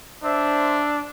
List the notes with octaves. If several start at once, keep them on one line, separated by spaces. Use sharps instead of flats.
D4 C5 E5